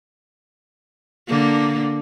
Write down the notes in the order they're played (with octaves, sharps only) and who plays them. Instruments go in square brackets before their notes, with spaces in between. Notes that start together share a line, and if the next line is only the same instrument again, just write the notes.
[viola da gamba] D3 A#3